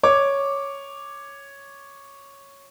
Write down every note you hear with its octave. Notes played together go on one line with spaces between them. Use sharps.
C#5 D6